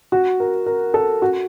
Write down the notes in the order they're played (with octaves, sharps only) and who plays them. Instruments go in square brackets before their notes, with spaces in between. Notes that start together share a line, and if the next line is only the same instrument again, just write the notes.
[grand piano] F#4
A#4
A#4
A4
F#4